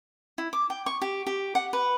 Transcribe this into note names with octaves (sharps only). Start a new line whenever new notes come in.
E4
D6
G5
C#6
G4
G4
F#5
B4